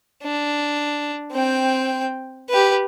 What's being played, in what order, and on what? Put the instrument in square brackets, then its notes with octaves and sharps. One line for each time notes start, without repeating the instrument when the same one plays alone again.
[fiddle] D4
C4 G5
G4 B4